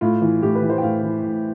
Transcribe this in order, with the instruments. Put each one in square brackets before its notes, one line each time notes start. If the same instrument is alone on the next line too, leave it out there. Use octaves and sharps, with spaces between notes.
[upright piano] A2 F4
E3
A2 G4
B4
E3
C5
G5
A2 F5
E3
A2